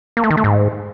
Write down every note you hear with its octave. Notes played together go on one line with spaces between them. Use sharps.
A#3
A3
D#3
A3
G#2